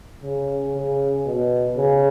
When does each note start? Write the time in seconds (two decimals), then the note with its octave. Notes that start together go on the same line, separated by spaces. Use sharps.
0.23 C#3
0.75 C#3
1.26 B2
1.77 C#3